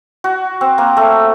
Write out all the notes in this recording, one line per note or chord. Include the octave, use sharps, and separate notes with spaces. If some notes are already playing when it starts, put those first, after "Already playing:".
F#4
C4
A#3
A3